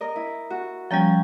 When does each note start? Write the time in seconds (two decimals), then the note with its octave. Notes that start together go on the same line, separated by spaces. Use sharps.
0.01 A#4 D#5
0.16 E4
0.50 F#4
0.91 F3 G3 C#4 G5 A#5